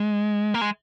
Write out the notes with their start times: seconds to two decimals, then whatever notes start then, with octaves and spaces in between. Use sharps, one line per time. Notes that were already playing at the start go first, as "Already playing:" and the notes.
Already playing: G#3
0.54 A#3
0.61 G#3